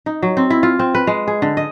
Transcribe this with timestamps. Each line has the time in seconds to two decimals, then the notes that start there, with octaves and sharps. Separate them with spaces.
0.06 D#4
0.23 F#3
0.37 C4
0.50 E4
0.63 F4
0.79 C4
0.95 B4
1.07 G#3
1.28 G#4
1.42 D3
1.57 D#5